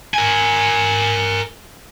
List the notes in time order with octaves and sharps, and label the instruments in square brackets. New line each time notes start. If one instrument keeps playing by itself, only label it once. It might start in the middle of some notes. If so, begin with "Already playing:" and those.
[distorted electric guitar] A#4 G#5